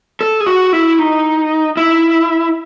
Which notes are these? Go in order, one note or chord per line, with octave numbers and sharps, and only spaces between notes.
A4
G#4
F#4
E4
D#4
E4